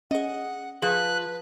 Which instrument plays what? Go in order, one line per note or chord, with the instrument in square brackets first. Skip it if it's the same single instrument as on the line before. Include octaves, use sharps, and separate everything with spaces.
[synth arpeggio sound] C#4 G#4 [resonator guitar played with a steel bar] D#5 [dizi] F#5
[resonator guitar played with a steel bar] F3 [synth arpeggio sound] G#4 [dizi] B4 [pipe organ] F#6